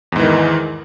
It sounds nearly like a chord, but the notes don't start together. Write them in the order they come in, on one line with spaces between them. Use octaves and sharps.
E2 G#2 E3 D#3